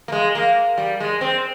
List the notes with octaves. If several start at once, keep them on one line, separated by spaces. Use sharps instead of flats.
A#3
G#3
A#3
G3
G#3
C4